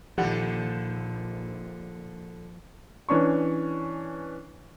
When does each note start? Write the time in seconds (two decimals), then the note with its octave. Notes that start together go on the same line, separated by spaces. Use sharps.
0.18 A#1 D3 D#3 F3 G3 A4 F#5
3.09 E3 C#4 D4 C#6